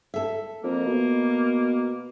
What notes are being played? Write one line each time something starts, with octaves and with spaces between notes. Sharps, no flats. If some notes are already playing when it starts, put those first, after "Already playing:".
A4 E5
F2 A#3
B2